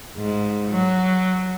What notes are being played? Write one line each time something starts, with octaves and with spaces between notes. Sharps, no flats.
G#2
F#3